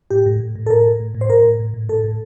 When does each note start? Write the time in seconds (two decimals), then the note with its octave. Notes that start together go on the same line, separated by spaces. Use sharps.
0.11 A2 G4
0.26 A2
0.40 A2
0.56 A2
0.66 A4
0.70 A2 A#4
0.86 A2
1.00 A2
1.15 A2
1.21 C5
1.29 A2 A#4
1.45 A2
1.59 A2
1.74 A2
1.89 A2 A4
2.04 A2